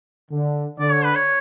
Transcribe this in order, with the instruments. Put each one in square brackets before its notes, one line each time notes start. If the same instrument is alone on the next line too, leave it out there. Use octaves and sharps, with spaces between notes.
[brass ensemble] D3
[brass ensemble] D3 [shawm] D5
[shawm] C#5
B4
C#5